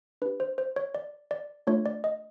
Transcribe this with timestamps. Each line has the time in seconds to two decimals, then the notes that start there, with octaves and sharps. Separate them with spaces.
0.22 D4 B4
0.26 G4
0.40 C5
0.58 C5
0.76 C#5
0.95 D5
1.31 D5
1.67 A3 D4 F4 C#5
1.86 D5
2.04 D#5